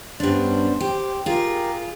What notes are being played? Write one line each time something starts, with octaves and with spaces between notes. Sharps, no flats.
G2 B3 C#4 D4 C5
G4 C5
F4 G4 G#4 A#4